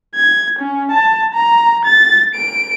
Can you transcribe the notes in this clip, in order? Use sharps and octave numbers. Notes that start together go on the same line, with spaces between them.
G#6
C#4
A5
A#5
A6
D7